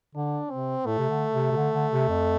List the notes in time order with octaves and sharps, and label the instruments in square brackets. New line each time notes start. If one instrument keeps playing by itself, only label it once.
[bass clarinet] D3 [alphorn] D4
[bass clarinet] C3 [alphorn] C4
[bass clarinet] A2 [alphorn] A3
[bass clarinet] C3
D3
C3
C3
D3
D3
C3
F2